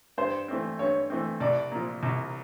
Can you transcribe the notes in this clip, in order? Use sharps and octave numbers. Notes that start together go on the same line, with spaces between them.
G2 C5
E3 A3 C4
G2 C#5
E3 A3 C4
C2 D5
A#2 F3
C2